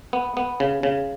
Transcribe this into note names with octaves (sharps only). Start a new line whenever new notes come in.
B3
B3
C#3
C#3